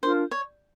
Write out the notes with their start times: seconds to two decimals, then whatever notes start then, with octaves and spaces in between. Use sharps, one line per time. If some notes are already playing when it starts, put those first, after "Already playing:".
0.02 D4 F4 A#4 C5
0.31 C#5